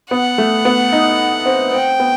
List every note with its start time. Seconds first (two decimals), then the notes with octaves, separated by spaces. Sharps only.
0.11 B3 F#5
0.38 A3
0.65 B3
0.93 D#4
1.46 C4
1.73 C4 G5
2.00 B3